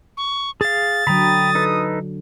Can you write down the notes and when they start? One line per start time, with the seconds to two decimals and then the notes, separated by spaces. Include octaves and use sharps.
0.17 C#6
0.61 G#4 F5 A6
1.07 D3 F#3 G5 A#5 B5 D#6
1.55 D#4 A4 B4